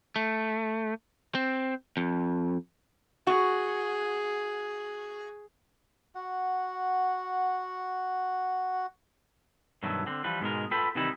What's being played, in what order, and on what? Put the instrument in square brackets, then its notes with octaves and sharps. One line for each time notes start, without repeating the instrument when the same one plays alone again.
[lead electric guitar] A3
C4
F2
[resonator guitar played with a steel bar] F#4 [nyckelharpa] G#4
[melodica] F#4 F#5
[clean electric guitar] G2 B2 D#3 E3 F#3 A3
D3 C4
E3 F3 G3 B4
G#2 B2 G#3 A#4
F4 A4 B4 G5 B5
C3 D#3 E3 G3 D#4 E4